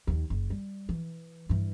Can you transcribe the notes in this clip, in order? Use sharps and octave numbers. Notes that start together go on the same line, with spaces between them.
D#2 D#3
F#1
G3
E3
G2 E3